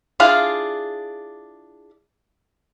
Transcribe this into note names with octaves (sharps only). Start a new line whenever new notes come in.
D4 E4 F4 G#4 F5